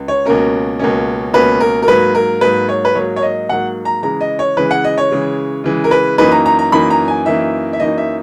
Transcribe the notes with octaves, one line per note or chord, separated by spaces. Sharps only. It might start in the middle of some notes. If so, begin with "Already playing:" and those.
Already playing: C#2
C#5
C#2 B2 A#3 C#4 A#4
C#2 B2 A#3 C#4
C#2 B2 A#3 C#4 B4
A#4
A#4
G#2 F#3 A#3 B4
A#4
G#2 F#3 A#3 B4
C#5
B4
G#2 F#3 A#3 C#5
C#5
D#5
G#2 F#3 A#3 F#5
A#5
C#3 E3 G#3 A#5
D#5
C#5
C#3 E3 G#3 B4
F#5
D#5
C#5
C#3 E3 G#3
C#3 E3 G#3
A#4
B4
F#2 E3 A#3 D#4 B4
A#5
A#5
A#5
F#2 E3 A#3 D#4 B5
A#5
G#5
F#2 E3 A#3 D#4 E5
E5
F#2 E3 A#3 D#4 D#5
E5